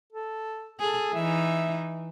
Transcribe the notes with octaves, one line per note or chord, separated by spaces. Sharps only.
A4
G#4 A4
E3 D#4 E5